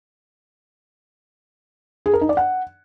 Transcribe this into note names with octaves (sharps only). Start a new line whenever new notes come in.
G#4
A#4
D#4
D5
F#5